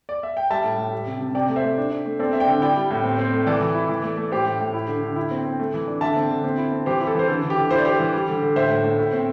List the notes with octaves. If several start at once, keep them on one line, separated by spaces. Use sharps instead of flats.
D5
E5
G5
G3 E5 A5
A2
A2
G3
C3
C3
C3 D5 G5
A3
C5 E5
A3
D4
D4
A3
C4 A4 D5
C4 E5
D5 G5
D3
E4 D5 G5
G3
A2
C4
C4
A3
E3 A4 D5
E3
E4
E3
A3
A3
A2 G4 C5
A2
A2
E4
D3
D3
E4
C4
C4
A3
E3
D4
D3 E5 A5
C4
D3
C4
E4
C4
E3 G4 C5
E4
A4
E3 C5
D3 A4
D3
G4
D3
E4 C5
D5
E4 G4 C5
E3
G3
D3
D3
A2 C5 E5
A2
A2
A2
C4